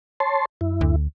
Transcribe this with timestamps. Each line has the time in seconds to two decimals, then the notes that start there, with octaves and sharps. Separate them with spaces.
0.20 C#5 A5 C6
0.61 F#2 E4
0.81 D2